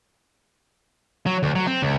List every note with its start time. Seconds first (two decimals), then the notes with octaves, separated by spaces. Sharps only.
1.26 F#3
1.43 D2
1.55 F#3
1.67 C4
1.82 C#2